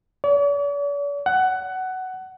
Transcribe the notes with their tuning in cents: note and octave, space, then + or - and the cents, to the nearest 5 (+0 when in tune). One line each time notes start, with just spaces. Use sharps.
D5 -45
F#5 +15